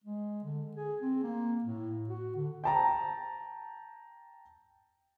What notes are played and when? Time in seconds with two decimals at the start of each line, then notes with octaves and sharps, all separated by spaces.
0.04 G#3
0.44 D3
0.77 G#4
1.02 C4
1.23 A#3
1.64 A2
2.09 F#4
2.36 D3
2.64 G5 A5 A#5